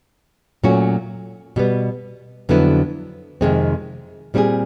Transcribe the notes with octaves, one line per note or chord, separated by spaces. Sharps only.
A#2 F#3 A3 C#4 F#4
B2 G3 B3
F2 D3 F#3 B3 E4
F2 C3 D#3 G#3 C4
A#2 G3 C4 E4 G#4